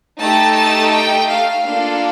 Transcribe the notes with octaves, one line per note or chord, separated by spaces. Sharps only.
A3 D#4 G4 A5
A5
G5
F5
A#3 D4 F4 A4 F5